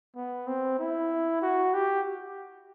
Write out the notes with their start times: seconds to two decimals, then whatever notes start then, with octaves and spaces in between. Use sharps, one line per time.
0.16 B3
0.47 C4
0.79 E4
1.42 F#4
1.74 G4